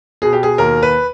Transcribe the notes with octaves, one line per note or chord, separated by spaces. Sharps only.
B2 G#4
G4
G#4
D#2 A#4
B4